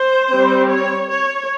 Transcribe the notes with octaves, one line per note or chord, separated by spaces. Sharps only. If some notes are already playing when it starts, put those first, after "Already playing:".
Already playing: C5
G3 C4
C#5
C#5